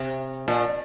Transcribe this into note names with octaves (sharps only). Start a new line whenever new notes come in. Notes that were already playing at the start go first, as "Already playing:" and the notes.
Already playing: C3
A#2